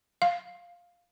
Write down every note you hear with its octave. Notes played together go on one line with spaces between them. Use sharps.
F5